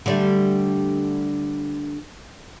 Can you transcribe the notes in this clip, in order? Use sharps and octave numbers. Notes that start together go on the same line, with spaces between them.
D3 G3 A3